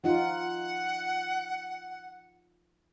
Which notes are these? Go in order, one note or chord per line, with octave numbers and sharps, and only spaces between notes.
F3 D#4 F4 F#5